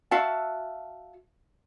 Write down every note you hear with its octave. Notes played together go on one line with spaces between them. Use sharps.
F#4 E5 F5 A5